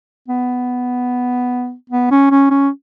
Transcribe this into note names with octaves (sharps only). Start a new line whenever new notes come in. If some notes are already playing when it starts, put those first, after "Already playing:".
B3
B3
C#4
C#4
C#4